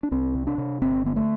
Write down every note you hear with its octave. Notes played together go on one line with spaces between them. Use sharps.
D4
C2 C4
C3
D4
C3
G1 C4
D3 B3
A3